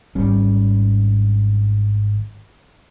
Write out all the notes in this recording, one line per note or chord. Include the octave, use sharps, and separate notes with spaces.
G#1 G3 C#4